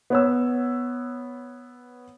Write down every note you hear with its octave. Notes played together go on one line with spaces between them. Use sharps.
B3 C#5 E6